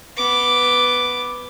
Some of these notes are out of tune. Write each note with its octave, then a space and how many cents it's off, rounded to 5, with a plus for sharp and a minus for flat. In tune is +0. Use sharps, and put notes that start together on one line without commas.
B3 +0 D6 +0